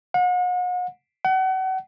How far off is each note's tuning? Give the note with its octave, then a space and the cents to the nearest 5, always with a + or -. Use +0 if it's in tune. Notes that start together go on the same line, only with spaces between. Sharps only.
F#5 -40
F#5 +35